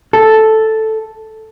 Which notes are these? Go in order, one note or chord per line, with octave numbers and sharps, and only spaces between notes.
A4